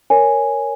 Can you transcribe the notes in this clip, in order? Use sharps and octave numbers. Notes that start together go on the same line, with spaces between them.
A#4 C#5 G#5